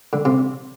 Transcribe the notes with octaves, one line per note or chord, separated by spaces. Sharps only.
D3
C3